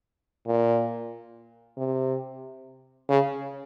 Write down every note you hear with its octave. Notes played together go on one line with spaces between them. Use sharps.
A#2
C3
C#3